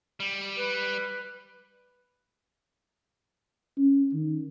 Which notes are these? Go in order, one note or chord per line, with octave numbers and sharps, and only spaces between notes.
G3
B4
C#4
D#3